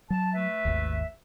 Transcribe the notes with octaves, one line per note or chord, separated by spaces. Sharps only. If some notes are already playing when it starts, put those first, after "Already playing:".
F#3 A5
A3 B4 E5
G#1 D#2